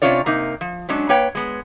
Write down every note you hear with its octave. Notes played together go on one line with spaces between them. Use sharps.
C3 E3 C#4 F4 C#5 D5
C3 A#3 D#4
F3
F#3 G#3 C#4 D4
A#3 B4 C#5 G5
G#3 B3